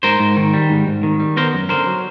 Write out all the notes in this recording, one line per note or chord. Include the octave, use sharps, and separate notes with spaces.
G#2 A#4 C5
G#2
D#3
G3
G#2
G#2
D#3
G3
B3 A#4 C5
F#2
D3 A#4 C5
F#3